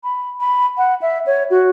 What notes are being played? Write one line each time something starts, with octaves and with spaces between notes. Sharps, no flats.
B5
B5
F#5
E5
C#5
F#4